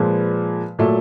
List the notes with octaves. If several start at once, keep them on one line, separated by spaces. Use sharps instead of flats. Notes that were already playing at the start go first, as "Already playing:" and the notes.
Already playing: A#2 F3 G#3 B4
A#2 F#3 A3